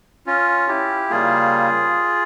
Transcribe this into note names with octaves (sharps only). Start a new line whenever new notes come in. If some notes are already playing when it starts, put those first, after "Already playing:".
C#4 F4
E4 G4
C#3 G3 A#3 F4 G#4